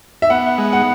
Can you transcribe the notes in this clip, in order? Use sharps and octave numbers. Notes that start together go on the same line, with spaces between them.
E5
B3 F#5
G#3
F#5